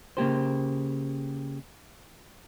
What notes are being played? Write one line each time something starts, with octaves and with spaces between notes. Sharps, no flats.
C#3 A#3 G4 C5